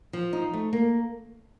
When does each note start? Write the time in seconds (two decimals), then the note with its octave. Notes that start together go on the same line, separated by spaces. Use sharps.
0.13 F3
0.33 D#4
0.53 A3
0.73 A#3